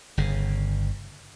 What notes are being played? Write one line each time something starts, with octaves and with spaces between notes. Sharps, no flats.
G1 C#3